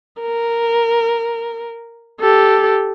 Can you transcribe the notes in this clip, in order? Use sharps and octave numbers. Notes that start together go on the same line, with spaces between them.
A#4
G4 A4